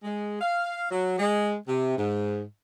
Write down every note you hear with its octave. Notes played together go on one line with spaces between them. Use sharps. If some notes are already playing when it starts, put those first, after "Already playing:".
G#3
F5
F#3
G#3
C3
G#2